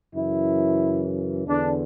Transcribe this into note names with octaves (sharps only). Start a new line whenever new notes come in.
F#2 C#3 E3 E4
E2 D3 D4